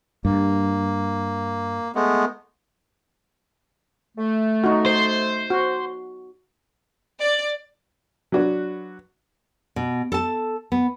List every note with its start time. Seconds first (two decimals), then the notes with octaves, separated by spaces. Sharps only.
0.25 G2 A#3
1.95 G#3 A3 B3
4.17 A3
4.64 D#4 F#4
4.86 C5
5.50 F#4
7.20 D5
8.32 F#3 D4 F#4 B4
9.76 B2
10.12 A4 A5
10.72 B3